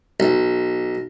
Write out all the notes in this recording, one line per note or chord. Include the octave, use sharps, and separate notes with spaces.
B1